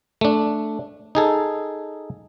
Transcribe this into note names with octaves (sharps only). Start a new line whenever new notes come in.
A3 D4
D#4 G#4 A4